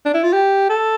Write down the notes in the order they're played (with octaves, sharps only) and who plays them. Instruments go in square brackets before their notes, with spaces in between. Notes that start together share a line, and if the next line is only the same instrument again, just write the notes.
[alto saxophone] D4
E4
F4
G4
A4